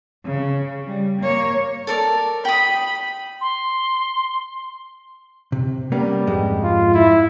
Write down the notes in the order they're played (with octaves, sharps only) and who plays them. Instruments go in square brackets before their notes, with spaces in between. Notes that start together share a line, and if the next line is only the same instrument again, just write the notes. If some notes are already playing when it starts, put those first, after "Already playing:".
[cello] C#3
G3
A#3 C#5
[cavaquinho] A4 A#4 D5
[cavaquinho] G5 D#6 [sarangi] B5
[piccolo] C6
[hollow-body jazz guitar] C3
[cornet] G3 [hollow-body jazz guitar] A#3 B3 C#4
[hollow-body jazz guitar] F2 G#2 G#3
[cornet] F4
E4